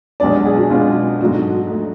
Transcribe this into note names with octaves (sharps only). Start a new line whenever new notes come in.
B1 B2 G#3 D4 D5
G#4
F#4
B1 B2 G#3 D4 F4
G#2 F#3 A3 D4 F#4
F#3 A3 D4